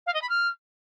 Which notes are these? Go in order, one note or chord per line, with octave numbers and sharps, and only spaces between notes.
F5
D#5
B5
F6